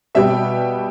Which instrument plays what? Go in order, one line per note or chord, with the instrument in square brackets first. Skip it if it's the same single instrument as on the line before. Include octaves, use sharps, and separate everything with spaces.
[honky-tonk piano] B2 G3 B3 G4 [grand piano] E5